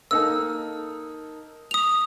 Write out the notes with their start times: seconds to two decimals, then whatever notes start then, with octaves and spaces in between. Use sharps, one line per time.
0.11 A#3 D#4 A4 E6
1.71 D#6 F7